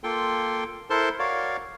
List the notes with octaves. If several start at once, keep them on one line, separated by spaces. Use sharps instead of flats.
A#3 F4 A4 G5 C6
E4 A4 A#4 C5 A5 C6
F#4 A#4 C#5 D5 F5